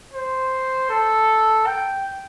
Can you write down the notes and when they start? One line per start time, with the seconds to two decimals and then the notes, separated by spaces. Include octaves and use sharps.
0.14 C5
0.90 A4
1.67 G5